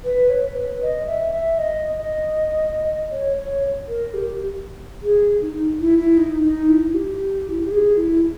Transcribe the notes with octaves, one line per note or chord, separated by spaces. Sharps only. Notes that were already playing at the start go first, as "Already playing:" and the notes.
B4
C#5
B4
D#5
E5
E5
D#5
D#5
C#5
C#5
A#4
G4
G#4
D#4
E4
E4
D#4
D#4
E4
G4
E4
G4
G#4
E4